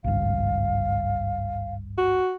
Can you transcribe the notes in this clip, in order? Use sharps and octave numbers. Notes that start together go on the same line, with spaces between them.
G#1 C#2 G2 F5
F#4